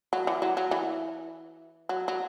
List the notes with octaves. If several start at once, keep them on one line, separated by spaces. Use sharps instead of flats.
F#3
E3
F#3
F#3
E3
F#3
F#3